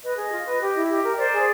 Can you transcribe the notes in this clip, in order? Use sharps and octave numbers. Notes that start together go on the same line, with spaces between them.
B4 D#5
G#4
F4
B4
G4
E4
G4
A#4
C5 D5
G#4